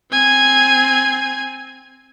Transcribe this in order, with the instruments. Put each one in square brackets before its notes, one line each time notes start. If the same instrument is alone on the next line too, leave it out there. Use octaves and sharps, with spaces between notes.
[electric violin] C4 G#5